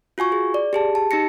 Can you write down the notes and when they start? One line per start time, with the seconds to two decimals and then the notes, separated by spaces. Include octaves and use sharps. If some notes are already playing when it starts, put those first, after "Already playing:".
0.18 F4 F#4 G#5 C#6
0.32 G#4
0.54 D5
0.73 G4 G#4 A5
0.95 A5
1.11 D#4 G4 A#6 C#7